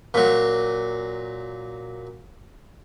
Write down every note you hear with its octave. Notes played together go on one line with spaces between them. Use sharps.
A#2 F#3